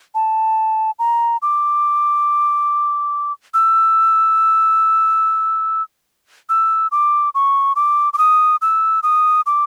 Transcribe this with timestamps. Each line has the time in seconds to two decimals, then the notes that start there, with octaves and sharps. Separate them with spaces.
0.15 A5
0.99 A#5
1.42 D6
3.54 E6
6.49 E6
6.92 D6
7.35 C#6
7.76 D6
8.13 D6
8.18 D#6
8.62 E6
9.03 D#6
9.46 D6